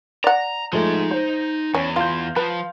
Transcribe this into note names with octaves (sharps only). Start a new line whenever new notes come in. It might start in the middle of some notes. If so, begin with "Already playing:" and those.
D5 F#5 A#5
F3 G#3 A3 D#4 C6
C5
E2 C#4
F4 F5 C6 G6
F3 B4